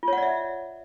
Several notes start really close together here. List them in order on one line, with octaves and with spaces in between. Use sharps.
F4 C#5 F#5 D5 E5